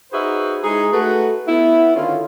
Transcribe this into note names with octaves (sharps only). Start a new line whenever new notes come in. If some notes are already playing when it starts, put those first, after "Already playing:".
D#4 F#4 G#4 B4 C5 E5
G#3 D#4 E4 G#4
A3 F#4 B4
B3 E4
D3 D#3 C#4 F4